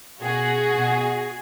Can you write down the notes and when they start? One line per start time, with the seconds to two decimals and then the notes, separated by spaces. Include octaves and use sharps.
0.21 B2 F#4 G#4
0.76 B2